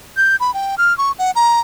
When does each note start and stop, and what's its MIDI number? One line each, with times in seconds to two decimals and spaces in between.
0.17 0.36 91
0.40 0.54 83
0.54 0.75 79
0.78 0.96 89
0.98 1.12 85
1.19 1.31 78
1.35 1.60 82